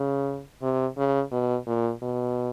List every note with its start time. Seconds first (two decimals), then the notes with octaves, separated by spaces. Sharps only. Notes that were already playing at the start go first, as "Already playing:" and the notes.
Already playing: C#3
0.62 C3
0.98 C#3
1.32 B2
1.67 A#2
2.02 B2